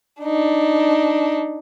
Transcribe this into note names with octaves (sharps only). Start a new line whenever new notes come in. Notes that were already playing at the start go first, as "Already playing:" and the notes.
D4 D#4